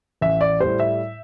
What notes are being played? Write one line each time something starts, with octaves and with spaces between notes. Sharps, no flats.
A1 E5
D5
A2 G3 C5
E5